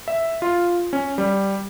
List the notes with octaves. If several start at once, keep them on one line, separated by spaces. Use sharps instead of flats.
E5
F4
C#4
G3